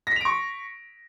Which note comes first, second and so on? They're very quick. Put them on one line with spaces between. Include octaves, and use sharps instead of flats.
A#6 B6 F7 D7 C#6